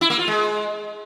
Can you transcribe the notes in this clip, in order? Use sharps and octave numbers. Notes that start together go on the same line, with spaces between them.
E4
A#3
F4
G#3